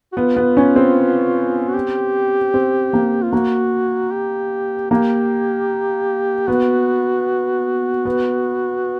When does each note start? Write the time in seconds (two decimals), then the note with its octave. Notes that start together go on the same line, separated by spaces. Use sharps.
0.12 F#4
0.17 B3 F4
0.37 B3
0.57 C#4
0.76 C4
1.68 F#4
1.75 G4
2.54 C4
2.93 A#3
3.23 F4
3.33 A#3 F#4
4.12 G4
4.90 A#3 G4
6.48 B3 F#4
8.05 B3